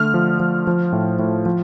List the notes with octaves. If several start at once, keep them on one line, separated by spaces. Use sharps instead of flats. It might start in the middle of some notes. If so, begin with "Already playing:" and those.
Already playing: D3 A3 F6
F3
F3
F3
A2
A2
F3